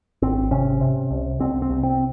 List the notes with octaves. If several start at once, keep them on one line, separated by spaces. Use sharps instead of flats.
G#1 C4
C3 C#4
C3
C2
C2 C4
C4
C2
C4